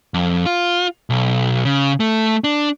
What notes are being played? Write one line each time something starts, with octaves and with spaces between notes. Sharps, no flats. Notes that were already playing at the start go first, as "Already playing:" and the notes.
F2
F4
B1
C#3
A3
D4